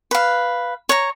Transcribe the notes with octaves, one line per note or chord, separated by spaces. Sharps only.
B4 F5
C#5 A#5